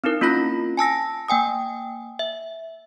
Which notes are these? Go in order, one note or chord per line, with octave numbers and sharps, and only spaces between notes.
C4 D#4 E4 A#4
A#3 C#4 F4 B5 A#6 B6
G#5 A5 E6 A#6
A#3 G5 G#5 D#6
E5